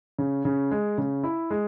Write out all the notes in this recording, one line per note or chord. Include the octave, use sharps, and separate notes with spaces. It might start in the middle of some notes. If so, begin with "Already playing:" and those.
C#3
C#3
G#3
C#3
E4
G#3